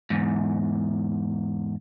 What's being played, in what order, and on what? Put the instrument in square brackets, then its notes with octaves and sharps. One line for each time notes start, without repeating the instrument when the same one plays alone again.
[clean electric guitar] E2 G#2